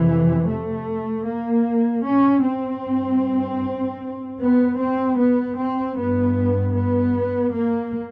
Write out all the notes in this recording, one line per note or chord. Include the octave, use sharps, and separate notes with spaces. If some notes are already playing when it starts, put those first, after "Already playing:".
Already playing: F2 C3 E3
A3
A#3
C#4
C4
G2
B3
C4
B3
C4
G2 B3
B3
A#3